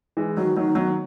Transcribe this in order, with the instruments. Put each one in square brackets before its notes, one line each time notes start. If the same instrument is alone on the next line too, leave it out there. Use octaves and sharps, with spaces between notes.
[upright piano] E3 G#3
[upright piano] D#3 F#3 [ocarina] F#4
[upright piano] D#3 F#3 [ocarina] D#4
[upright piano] D#3 F#3 [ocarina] B3